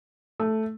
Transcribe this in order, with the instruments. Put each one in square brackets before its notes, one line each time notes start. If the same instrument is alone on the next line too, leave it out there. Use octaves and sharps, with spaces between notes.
[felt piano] A3